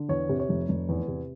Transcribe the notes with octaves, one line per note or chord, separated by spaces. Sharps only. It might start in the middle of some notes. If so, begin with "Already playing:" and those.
Already playing: D3
E2 C#5
C3
C#5
F1
F1
E2
C3